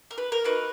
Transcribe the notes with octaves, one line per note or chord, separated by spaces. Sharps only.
A#4
B4
A#4
A#3 D#4 F#4 B4